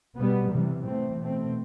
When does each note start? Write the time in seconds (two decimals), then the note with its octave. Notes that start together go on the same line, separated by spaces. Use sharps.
0.17 B2 G3 B3
0.51 C3 E3 G3
0.86 A2 E3 A3 C4
1.20 B2 A3 C4